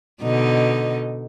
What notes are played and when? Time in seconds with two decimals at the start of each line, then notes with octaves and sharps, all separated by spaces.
0.23 B2 D3 D#4